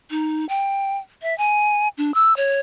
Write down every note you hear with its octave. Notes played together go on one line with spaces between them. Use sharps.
D#4
G5
E5
G#5
D4
E6
C#5